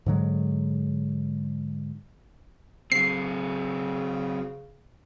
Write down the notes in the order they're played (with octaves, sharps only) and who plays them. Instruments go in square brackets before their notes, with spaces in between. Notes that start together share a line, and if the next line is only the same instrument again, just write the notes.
[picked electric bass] G#2 D3 F#3 G#3
[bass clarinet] C#3 [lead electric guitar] F#3 C4 [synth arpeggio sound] C7